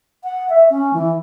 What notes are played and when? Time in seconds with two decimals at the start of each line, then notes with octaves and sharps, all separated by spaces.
0.23 F#5
0.49 E5
0.70 C#4
0.93 E3